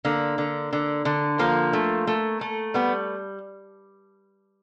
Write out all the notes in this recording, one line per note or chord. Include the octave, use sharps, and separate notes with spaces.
D3 A#3
D3
D3
D3
F3 A#3
A3
A3
A3
G3 B3